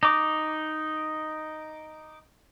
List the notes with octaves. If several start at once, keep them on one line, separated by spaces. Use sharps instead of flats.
D#4 D6